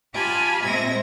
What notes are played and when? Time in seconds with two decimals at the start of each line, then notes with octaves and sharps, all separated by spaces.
0.14 F4 G4 F5 G#5 A5 B5
0.63 A#2 G#3 C4 E5 G#6 A#6